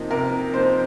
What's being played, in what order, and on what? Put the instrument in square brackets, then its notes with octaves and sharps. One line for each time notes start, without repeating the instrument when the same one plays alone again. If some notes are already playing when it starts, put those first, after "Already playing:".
Already playing: [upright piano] C3 F3 A#3 D#4
C3 A#4
F3 A#3 D#4 C5